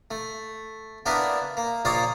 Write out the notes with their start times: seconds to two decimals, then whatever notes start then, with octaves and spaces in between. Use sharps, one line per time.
0.11 A3
1.06 A#3 B3 D4 E4 A#4 B4
1.57 A#3
1.85 A#1 A#3 C#5 D5 F5 D#6